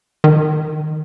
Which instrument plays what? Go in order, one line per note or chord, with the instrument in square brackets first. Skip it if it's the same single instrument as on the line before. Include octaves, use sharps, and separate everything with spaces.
[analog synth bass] D#3